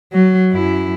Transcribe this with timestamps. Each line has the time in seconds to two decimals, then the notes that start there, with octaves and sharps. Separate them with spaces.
0.13 F#3
0.52 F#2 E4